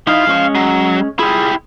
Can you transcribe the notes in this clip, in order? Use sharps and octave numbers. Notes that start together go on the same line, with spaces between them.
F3 D#4 E4 F5
G#3 C#4 C#6
F#3
E4 F4 G4 G#4